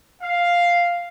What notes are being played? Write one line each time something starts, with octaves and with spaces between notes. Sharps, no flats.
F5